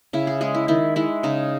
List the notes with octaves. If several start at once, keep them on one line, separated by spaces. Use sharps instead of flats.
C#3 E4
G#4
G#3 G#4
E4
D#3 E4
G#3 E4
C#3 D#4